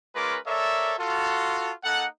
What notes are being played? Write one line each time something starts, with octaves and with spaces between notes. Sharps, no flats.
G#3 C#4 F4 A#4 B4 D6
A4 A#4 C#5 D5 E5
F4 F#4 A4
A#3 D#4 A4 F#5